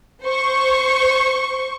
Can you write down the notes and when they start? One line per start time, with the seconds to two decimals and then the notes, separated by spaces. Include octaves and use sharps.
0.25 C5 C#6